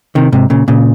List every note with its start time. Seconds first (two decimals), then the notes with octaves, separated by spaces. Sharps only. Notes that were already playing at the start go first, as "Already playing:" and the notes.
0.15 C3 D#3
0.32 G#2 C3
0.50 A#2 C#3
0.68 A#2 C#3